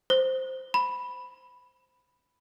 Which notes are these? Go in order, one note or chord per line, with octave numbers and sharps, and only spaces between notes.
C5
B5